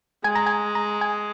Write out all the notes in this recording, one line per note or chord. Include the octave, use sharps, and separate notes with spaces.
G#3 G#5
A#5
G#5
A#5
G#5